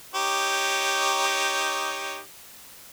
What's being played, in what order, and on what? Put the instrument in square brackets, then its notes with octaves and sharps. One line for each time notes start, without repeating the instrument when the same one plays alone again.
[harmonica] D#4 G4 C#5